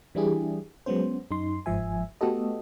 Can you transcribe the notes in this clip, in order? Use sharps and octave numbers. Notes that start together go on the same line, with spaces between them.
E3 G3 D4 E4 G4 G#4
F#3 G#3 B3 C#4 C5
F#2 D#4 C6
G1 G#2 F3 E5 G#5
A3 B3 F#4 G4 A4 D#5